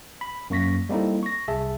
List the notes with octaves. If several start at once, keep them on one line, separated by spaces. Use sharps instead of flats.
B5
F#2 A#3 C#6 A#6 B6
G3 A#3 C4 D#4 E4 A4
C#6 A#6
C2 G#4 E5 A5